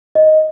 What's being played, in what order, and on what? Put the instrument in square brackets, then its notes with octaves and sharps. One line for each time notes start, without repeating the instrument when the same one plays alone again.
[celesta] D#5